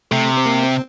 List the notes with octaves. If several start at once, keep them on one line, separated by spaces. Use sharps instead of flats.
C3 A3
C4
A#3
C4